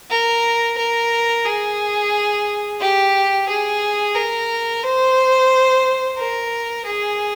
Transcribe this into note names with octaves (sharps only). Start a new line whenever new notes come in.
A#4
A#4
G#4
G4
G#4
A#4
C5
A#4
G#4